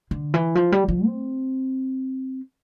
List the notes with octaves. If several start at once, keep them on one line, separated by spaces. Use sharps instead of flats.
D3
E3
F3
G3
F3
C4